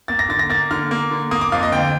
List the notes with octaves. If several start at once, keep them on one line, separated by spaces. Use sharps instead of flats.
A#3 A6
A#6
D3 A6
A#6
A#3 A6
D3 F6
A#3
D3
A#3 D#6
D6
F2 F5
D#5
D2 G5